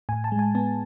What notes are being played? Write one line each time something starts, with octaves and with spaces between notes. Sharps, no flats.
A2 G#5
A5
G#3
G#5
B3 A5